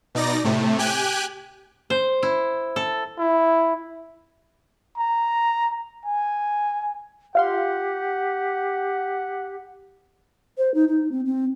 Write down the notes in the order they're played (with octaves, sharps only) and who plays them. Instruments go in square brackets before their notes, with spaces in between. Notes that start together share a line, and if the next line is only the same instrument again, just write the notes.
[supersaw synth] B2 D#4 D5 A#6
A2 C3 A3
G4 G5 G#5 F#6
[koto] C5
E4
A4
[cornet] E4
A#5
G#5
[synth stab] F4 F5 C6 [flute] G4 [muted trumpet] F#5
[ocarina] C5
D#4
D#4
C4
C4